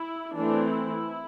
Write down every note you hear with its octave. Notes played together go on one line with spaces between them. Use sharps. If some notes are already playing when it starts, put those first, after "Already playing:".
Already playing: E4
E3 A3 C4 D4
E4